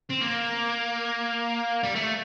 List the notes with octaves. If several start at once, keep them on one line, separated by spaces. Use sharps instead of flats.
C4
A#3
G3
A3